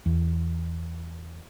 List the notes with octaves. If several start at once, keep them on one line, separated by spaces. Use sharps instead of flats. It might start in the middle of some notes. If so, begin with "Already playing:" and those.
E2